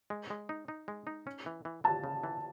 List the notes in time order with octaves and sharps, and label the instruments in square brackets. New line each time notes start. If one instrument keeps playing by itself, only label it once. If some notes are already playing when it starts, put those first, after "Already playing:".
[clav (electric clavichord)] G#3
G#3
D#4
D#4
G#3
D#4
C#4
E3
E3
[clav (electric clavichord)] E3 [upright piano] A5
[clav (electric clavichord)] C#3
E3